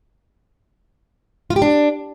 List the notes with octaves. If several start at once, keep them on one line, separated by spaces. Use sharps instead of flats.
F4
G4
D4